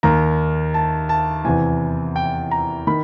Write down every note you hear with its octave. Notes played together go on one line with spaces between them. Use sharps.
D#2 D#3 A#5
A5
A5
E2 C3 E3 G#5
G5
A#5
D#3 B5